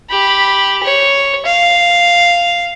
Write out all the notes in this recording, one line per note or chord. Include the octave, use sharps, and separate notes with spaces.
G4 B5
C#5
F5